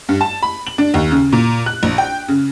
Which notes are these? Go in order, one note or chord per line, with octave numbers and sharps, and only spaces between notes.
G2
A5
B5
F#7
D4
D#2
C#3
A#2
F#6
A#1
G5
C#3